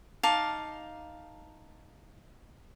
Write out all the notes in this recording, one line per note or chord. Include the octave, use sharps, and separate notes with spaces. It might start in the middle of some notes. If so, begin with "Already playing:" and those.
D#4 F5 A5 D6